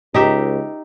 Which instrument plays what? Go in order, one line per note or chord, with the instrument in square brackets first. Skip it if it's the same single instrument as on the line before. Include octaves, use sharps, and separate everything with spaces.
[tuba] C#2 [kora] D#4 G4 E5